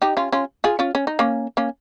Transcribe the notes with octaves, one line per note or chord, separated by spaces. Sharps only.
D#4 G4
C#4 F4
C#4 F4
F4 G#4
C#4 F4
C#4
D#4
A#3 C#4
A#3 C#4